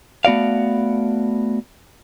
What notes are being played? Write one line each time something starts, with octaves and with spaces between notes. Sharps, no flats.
A3 B3 F#4 D5 F5